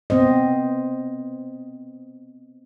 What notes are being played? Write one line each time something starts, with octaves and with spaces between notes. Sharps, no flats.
B3 C4 C5 D#5